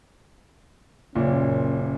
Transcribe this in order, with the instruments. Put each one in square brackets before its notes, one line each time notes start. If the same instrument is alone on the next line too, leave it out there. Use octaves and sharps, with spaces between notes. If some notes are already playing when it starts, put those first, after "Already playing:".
[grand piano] F#1 A#2 [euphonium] C#4